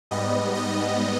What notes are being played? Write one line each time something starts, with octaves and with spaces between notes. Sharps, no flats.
G#2 G3 B3 D#5
D#5